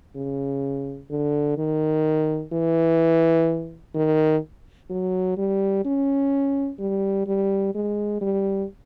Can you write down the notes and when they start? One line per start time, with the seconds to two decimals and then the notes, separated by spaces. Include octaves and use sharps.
0.16 C#3
1.10 D3
1.58 D#3
2.53 E3
3.95 D#3
4.90 F#3
5.37 G3
5.85 C#4
6.79 G3
7.27 G3
7.75 G#3
8.21 G3